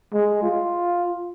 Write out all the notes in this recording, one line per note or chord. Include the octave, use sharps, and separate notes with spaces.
G#3
F4